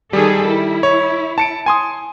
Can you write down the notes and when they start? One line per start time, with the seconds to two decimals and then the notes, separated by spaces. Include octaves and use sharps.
0.13 D#3 G3 G#4 A4
0.48 E4
0.83 C#5
1.38 A5 C#7 D7
1.66 G#5 C6 D#6